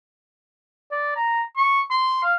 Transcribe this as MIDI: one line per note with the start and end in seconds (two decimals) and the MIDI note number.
0.91 1.15 74
1.16 1.41 82
1.57 1.81 85
1.91 2.21 84
2.23 2.34 77